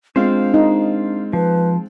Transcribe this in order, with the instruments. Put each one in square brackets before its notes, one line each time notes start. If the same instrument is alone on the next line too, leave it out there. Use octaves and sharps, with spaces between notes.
[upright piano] G#3 C4 F4 [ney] D4 [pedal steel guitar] C5 F5
[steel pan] D#4
[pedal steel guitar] F3 [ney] B4